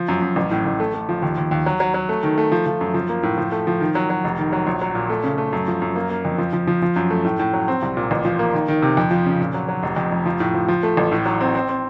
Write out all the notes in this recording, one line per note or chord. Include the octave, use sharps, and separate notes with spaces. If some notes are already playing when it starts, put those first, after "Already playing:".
Already playing: F3
F#2
F#2
A1
A2
A1
A3
A3
F3
D#2
D#2
D#2
F#3
F#3
F#3
A3
D#3
A3
F3
F3
F#2
F3
A#3
A2
F3
A3
F3
D#3
F#3
F#3
F1
D#3
F#3
A#1
F#3
A#2
A3
C#3
A3
F#2
F3
F#2
A#3
A#3
F2
F3
F3
F3
F3
F#2
A3
A2
A2
F#3
C4
C2
A#2
A1
F3
A#3
D#3
D#3
C3
F2
F3
C#3
A#2
F#3
F#3
F1
F2
F1
F3
A2
F3
F3
A3
A1
A2
F#3
C4
C4
C4